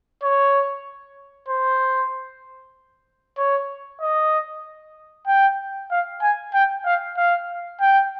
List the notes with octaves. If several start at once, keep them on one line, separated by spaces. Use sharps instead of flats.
C#5
C5
C#5
D#5
G5
F5
G#5
G5
F5
F5
G5